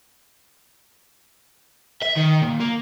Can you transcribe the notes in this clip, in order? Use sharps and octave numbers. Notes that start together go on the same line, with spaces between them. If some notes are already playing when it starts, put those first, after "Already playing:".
E5
D#3
A#2
A#3